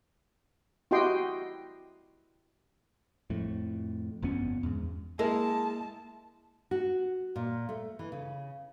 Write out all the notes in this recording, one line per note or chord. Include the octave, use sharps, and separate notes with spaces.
E4 F#4 G4 D#5 G5 C6
F2 A2
G1 F2 B3 C#4
E2 G#2
G#3 A#3 E4 A#4 A5
F#4
A#2
A3
E3
C#3